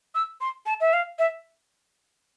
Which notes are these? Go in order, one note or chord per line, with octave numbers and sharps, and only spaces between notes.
E6
C6
A5
E5
F5
E5